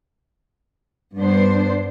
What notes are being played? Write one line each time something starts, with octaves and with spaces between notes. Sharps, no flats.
G2 B3 D4 C5